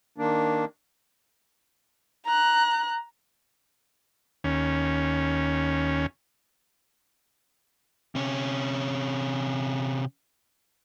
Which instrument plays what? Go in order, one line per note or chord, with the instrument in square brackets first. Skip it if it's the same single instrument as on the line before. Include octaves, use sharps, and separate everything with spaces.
[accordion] D#3 A#3 D4
[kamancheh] A#5 F#6
[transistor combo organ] D#2 C#4
[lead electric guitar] C3 C#4